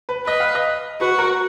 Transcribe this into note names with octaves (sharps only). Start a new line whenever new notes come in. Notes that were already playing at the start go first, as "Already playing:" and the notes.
B4
B4 D#5
F5
D#5
F#4 B4
A#4